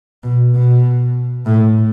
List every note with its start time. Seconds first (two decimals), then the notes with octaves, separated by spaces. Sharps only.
0.24 B2
0.54 B2
1.46 A2